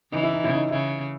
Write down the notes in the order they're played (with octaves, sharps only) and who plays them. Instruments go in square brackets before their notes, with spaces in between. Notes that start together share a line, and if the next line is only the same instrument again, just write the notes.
[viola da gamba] C#3 E3 [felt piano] D#4
[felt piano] E4
D#4
[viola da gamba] C#3 [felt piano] E4
[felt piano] D#4
[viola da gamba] C#3 [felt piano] E4